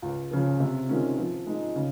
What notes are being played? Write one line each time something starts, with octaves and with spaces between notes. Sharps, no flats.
C#2
C#3 F3
C3
D#3 G#3 C#4 F4
F3
G#3 D#4
C#3